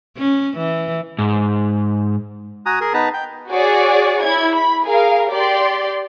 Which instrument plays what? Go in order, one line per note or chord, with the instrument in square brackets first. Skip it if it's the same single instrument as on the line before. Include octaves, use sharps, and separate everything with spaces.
[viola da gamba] C#4
E3
[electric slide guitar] G#2
[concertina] F#4 G#5 A#5 D#6
G#4 A#4
B3 D#4 B4 A5 A#5
G5
[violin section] F#4 G#4 C#5 D5
E4 G#6
B5
G#4 A#4 F5
G4 D5 C6